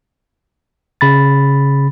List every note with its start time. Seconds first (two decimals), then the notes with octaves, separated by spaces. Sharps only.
1.01 C#3 B5 A6